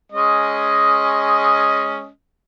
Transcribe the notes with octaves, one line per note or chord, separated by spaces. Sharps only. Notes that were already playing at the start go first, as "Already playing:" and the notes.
G#3 C#4 D#5